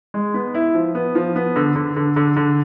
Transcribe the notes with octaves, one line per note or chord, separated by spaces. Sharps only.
G#3
B3
E4
F3
B3
F3
B3
D3
D3
D3
D3
D3